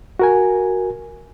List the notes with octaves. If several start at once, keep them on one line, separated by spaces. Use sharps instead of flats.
F#4 A#4 G#5